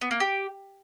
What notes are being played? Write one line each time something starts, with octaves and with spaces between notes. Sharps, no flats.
B3
A#3
G4